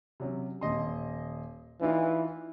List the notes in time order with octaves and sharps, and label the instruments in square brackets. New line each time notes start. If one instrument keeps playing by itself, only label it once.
[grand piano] C3 F#3 C#4
D#1 D#5 C6
[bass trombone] E3 [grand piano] D4 D#4 F4